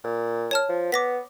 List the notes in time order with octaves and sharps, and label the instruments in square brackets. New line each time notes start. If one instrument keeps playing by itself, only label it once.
[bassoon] A#2
[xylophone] C#5 A5 F6
[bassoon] F3
[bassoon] B3 [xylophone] D6 A#6 B6